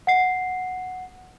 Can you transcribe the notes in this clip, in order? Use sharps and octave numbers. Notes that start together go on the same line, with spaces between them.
F#5 C7